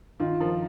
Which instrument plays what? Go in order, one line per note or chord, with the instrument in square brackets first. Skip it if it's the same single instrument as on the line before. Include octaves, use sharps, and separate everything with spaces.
[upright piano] D#3 [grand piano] F4
[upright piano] F3 [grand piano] A#4